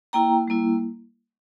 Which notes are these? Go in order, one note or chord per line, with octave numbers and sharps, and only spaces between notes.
A#3 E4 G5 A#5
G3 A#3 E4